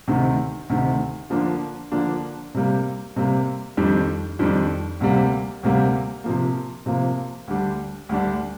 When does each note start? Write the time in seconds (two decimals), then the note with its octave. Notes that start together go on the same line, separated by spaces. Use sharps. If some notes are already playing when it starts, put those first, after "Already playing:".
0.07 D2 C3 D#3
0.69 D2 C3 D#3
1.30 D3 F3 A#3 D4
1.92 D3 F3 A#3 D4
2.54 C3 G3 A#3
3.16 C3 G3 A#3
3.77 F2 D#3 G3 D4
4.39 F2 D#3 G3 D4
5.00 D2 C3 G3 A#3
5.63 D2 C3 G3 A#3
6.24 C3 F3 A#3
6.86 C3 F3 A#3
7.47 D2 D3 G3 D4
8.09 D2 D3 G3 D4